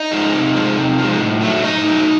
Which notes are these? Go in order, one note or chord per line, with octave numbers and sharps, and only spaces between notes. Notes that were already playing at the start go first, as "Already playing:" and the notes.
Already playing: D#4 D#5
F3 G#3
C3
F3 G#3
C3
F3 G#3
A2
F#3 A3
A2 D#4 D#5
F#3 A3